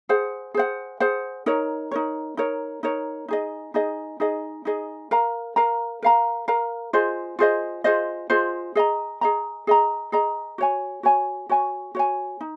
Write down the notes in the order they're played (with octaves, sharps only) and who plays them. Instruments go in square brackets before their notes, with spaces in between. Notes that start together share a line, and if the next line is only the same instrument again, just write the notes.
[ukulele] G#4 C5 F#5
G#4 C5 F#5
G#4 C5 F#5
D#4 A#4 C#5
D#4 A#4 C#5
D#4 A#4 C#5
D#4 A#4 C#5
D#4 G#4 D#5
D#4 G#4 D#5
D#4 G#4 D#5
D#4 G#4 D#5
A#4 F5 A#5
A#4 F5 A#5
A#4 F5 A#5
A#4 F5 A#5
F4 G#4 C5 D#5
F4 G#4 C5 D#5
F4 G#4 C5 D#5
F4 G#4 C5 D#5
G#4 D#5 A#5
G#4 D#5 A#5
G#4 D#5 A#5
G#4 D#5 A#5
F#4 C#5 G#5
F#4 C#5 G#5
F#4 C#5 G#5
F#4 C#5 G#5
D#4